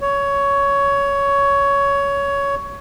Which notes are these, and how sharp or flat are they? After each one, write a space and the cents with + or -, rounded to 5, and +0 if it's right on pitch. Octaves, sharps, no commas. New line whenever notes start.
C#5 +15